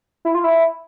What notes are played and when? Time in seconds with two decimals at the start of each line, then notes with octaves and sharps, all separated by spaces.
0.25 E4
0.35 F4
0.44 E4